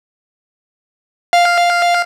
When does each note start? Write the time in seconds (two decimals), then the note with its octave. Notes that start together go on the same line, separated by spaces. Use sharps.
1.33 F5